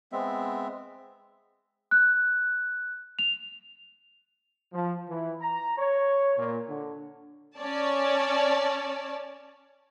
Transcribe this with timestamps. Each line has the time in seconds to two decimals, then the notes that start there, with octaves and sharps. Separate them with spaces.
0.12 G#3 B3 C4 E5
1.91 F#6
3.19 F7
4.73 F3
5.08 E3
5.40 A#5
5.78 C#5
6.38 A#2
6.68 D3
7.58 C#4 C#5 D5 A5